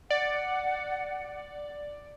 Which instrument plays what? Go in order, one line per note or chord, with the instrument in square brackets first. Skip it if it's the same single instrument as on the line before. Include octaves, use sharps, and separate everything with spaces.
[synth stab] D5 [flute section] F#5